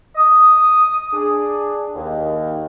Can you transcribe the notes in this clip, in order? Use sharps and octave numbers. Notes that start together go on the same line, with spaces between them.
D#6
D4 G#4
D#2